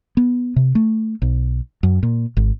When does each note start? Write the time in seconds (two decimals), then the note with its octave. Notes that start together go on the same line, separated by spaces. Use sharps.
0.17 B3
0.56 C3
0.75 A3
1.22 B1
1.83 F#2
2.03 A#2
2.37 G#1